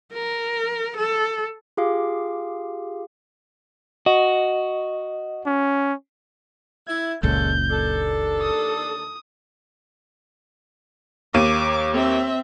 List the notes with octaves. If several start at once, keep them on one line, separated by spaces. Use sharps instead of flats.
A#4
A4
F4 G4 G#4 F5 D6
F#4 D#5
C#4
E4 G#6
F#1 C#2 A#2 G#3 C#4 A4 G6
D#2 D4 A4
D#6
D#2 A#3 D6 D#7
C4 E5